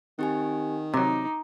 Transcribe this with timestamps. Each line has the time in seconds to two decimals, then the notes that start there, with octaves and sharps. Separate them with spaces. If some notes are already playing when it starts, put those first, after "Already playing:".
0.19 D#3 C4 G4 G#5
0.94 C3 F#3 D#4 A#5 D6